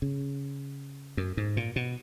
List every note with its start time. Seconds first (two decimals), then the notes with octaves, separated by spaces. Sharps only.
0.02 C#3
1.17 F#2
1.37 G#2
1.57 A#2
1.76 B2